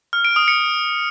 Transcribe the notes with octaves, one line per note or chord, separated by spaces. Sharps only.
F6
D7
D#6
C#7